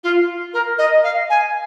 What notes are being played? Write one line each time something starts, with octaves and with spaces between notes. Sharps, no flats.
F4
A#4
D#5
F5
G#5